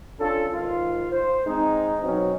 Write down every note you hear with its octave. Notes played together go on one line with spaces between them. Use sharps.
C#4 D4 F4 A4
G#2 D#3 F4
C5
G#3 C4 D#4
B2 F#3 C4 C#4 D#4